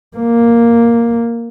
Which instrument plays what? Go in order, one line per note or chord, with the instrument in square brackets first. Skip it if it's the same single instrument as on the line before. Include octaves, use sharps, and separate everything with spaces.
[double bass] A#3